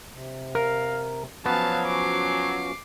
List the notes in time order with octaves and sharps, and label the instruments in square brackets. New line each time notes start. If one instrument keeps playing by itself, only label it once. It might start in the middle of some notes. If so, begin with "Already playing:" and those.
[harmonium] C3
[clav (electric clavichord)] A#4 [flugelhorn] F5
[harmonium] F3 C#4 F#4 [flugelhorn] F#3 [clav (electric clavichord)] B3 [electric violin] F5 A5
[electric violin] D6 C7